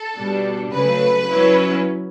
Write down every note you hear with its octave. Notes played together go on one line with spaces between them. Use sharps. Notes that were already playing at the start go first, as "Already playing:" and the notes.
Already playing: A4
B2 G3 D4
C#3 F#3 A3 B4
F#3 C#4 E4